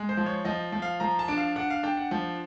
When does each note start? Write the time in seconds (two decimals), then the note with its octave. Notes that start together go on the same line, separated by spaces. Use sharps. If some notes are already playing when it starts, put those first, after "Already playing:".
Already playing: G#3
0.09 C5
0.17 F3
0.26 C#5
0.45 F3 D#5
0.72 F3
0.82 F5
1.00 F3 A#5
1.19 A5
1.28 D4
1.37 F5
1.56 D4 F#5
1.70 F5
1.83 D4 G5
1.97 F#5
2.11 F3